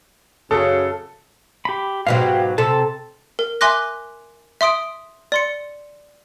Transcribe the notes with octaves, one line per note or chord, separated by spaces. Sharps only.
F#2 C#3 A4
G4 B5
G#2 B2 F#3 G4 F5
C3 A4 A5
A#4
E5 G#5 C6 D6 F#6 A#6
E5 C6 D#6 D7
D5 C6 C#7